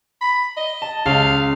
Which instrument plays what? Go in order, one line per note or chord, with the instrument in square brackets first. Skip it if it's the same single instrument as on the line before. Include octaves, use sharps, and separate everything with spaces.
[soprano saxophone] B5
D#5
[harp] A5
[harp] C#2 [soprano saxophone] F5